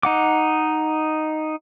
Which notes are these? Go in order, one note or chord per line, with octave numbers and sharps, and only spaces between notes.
D#4 F#5 D6